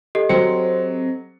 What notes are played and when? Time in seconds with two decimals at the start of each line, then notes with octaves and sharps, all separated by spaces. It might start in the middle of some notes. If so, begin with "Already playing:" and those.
0.15 G4 A4 D#5
0.29 F#3 C4 C#7